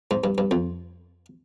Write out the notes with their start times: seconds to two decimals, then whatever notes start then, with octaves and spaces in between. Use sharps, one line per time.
0.11 G#2
0.24 G2
0.38 G2
0.51 F2